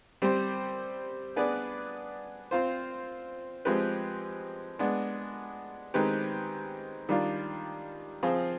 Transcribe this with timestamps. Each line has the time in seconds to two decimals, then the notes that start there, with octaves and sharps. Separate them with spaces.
0.22 G3 C4 G4 C5
1.36 B3 D4 G#4 B4 D5
2.51 C4 F4 C5
3.65 F3 G#3 C4 G4 B4
4.79 G#3 B3 D4
5.94 D#3 G#3 C4 G4 B4
7.09 D#3 G3 D4 F4
8.23 F3 C4 F4 G#4